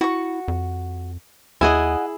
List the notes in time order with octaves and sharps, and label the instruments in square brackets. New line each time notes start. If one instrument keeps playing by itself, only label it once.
[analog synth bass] E4 [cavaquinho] F#4 C#6
[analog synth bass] F2
[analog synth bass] D#2 [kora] E4 G#4 [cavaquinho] D#5 F#5 G#5